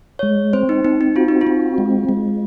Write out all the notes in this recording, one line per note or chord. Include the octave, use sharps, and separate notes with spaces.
G#3 C#5
C4 C5
D#4
C4 D#4
D#4
F4 F#4
D#4
F4
C4
G#3
G#3